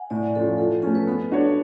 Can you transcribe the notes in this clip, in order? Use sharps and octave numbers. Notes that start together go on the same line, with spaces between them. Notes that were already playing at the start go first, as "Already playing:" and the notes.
Already playing: F#5 G#5
A2 D5
F3 A3 C#4 F4 A4
F3 A4
A3 C#4 A4
B4
B3 A4
D4 F#4 C#5